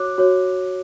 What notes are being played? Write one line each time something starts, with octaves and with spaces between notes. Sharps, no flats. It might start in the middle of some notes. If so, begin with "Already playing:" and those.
Already playing: F#4 C#5 D6 F#6
F#4 C#5